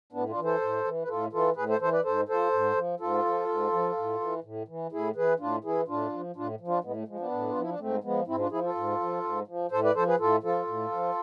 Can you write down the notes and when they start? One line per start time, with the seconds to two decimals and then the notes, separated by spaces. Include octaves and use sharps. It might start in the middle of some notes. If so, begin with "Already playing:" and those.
0.13 A2 B3 D4
0.29 D4 F4
0.37 E3
0.44 A4 C5
0.61 A2
0.84 E3
1.02 B4
1.08 A2 F4 A4
1.33 E3 F4 A4
1.56 A2 G#4 B4
1.69 A4 C5
1.81 E3 A4 C5
1.92 B4 D5
2.04 G#2 A4 C5
2.28 F3 A4 C5
2.53 G#2
2.76 F3
3.00 G#2 F4 A4
3.25 F3
3.48 G#2
3.72 F3
3.97 A2
4.21 E3
4.44 A2
4.68 E3
4.92 A2 E4 G#4
5.16 E3 G#4 B4
5.39 A2 D4 F4
5.64 E3 E4 G#4
5.88 A2 D4 F4
6.12 F3
6.36 A2 D4 F4
6.61 F3
6.67 D4 F4
6.84 A2 G#3 B3
6.96 A3
7.08 F3 G#3
7.19 B3 D4
7.31 A2
7.49 F4
7.56 F3 E4
7.69 D4
7.79 G#2 A3 C4
8.04 F3 G#3 B3
8.27 G#2 C4 E4
8.39 D4 F4
8.51 F3 E4 G#4
8.64 F4 A4
8.75 G#2
9.00 F3
9.24 G#2
9.47 F3
9.71 A2 A4 C5
9.84 B4 D5
9.95 F3 A4 C5
10.07 G#4 B4
10.19 A2 F4 A4
10.43 F3 F4 A4
10.67 A2
10.91 F3